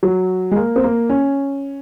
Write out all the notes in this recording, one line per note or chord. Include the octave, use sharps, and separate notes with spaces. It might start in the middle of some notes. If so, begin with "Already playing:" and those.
F#3
G#3
A#3
C4
A#3
C#4